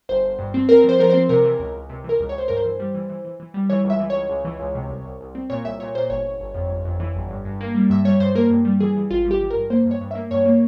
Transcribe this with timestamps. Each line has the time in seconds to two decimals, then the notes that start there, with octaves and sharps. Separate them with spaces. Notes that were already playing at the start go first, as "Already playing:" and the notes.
0.09 G1 C5
0.24 G1
0.39 G2
0.54 C4
0.69 C4 A#4
0.84 F3 C5
0.99 F3 A#4
1.10 C4 C5
1.29 C3 A#4
1.44 E3
1.59 C#2
1.74 C#2
1.90 C3
2.04 E3 A#4
2.20 C#2
2.29 C#5
2.34 C#2 C5
2.48 G2 A#4
2.57 C5
2.64 E3
2.80 G3
2.95 E3
3.09 E3
3.25 E3
3.40 E3
3.54 G3
3.70 E3 C#5
3.84 C#2
3.90 E5
4.00 E3
4.10 C#2 C#5
4.29 C#2
4.45 E3
4.60 C#2
4.75 C3
4.90 C2
5.04 C2
5.20 C2
5.35 C4
5.50 A#2 C#5
5.65 C2 E5
5.80 A#2 C#5
5.95 A#2 C5
6.10 G1 C#5
6.25 G1
6.40 G1
6.54 F2
6.70 G1
6.85 F2
7.00 E3
7.15 G1
7.31 G2
7.45 G2
7.61 A#3
7.75 G3
7.90 G2 E5
8.05 G3 C#5
8.20 G2 C5
8.35 A#3 A#4
8.50 G2
8.65 G3
8.80 E3 G#4
8.96 E3
9.10 G#1 F4
9.25 G3
9.31 G4
9.41 E3
9.50 G2 A#4
9.70 A#3 C5
9.86 G2
9.91 C#5
10.01 G2
10.11 A#3 E5
10.31 G2 C#5
10.46 A#3